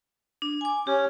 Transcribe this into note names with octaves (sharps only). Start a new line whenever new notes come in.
D4
G#5 D6
C#4 G4